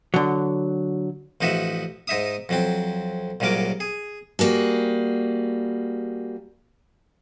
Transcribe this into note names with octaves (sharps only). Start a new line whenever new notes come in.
D3 F#3
A1 F3 D#4 F#4 E5
G#2 D#4 E5 D#6
F2 F#3 C4
C2 A#2 C#3 F#3 A#4 D6
G#4
G3 A#3 F#4 G#4